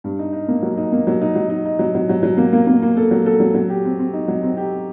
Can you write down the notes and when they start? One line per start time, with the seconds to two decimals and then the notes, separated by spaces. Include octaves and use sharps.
0.04 G2
0.19 D#4
0.33 D#4
0.48 A#3
0.62 F#3
0.77 D#4
0.92 A#3
1.07 F#3
1.21 D#4
1.35 F#3
1.50 D#4
1.65 D#4
1.79 F#3
1.95 F#3
2.09 F#3
2.23 F#3
2.37 A#3
2.53 A#3
2.67 A#3
2.83 A#3
2.97 A4
3.11 F#3
3.26 A4
3.40 F#3
3.54 F#3
3.69 G4
3.85 C4
3.99 C4
4.14 D#4
4.28 F#3
4.43 C4
4.57 G4